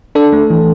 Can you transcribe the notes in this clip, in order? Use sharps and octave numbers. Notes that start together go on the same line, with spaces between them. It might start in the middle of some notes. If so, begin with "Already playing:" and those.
D4 A4
A3
E3